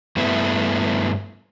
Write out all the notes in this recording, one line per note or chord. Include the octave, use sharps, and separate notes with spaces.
G2 A3 B3 E4